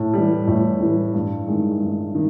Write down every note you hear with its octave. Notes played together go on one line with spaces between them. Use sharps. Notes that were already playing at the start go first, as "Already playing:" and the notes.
Already playing: A2
E3 G3
A2
E3 G3
G2
D#3 G#3
G2
D#3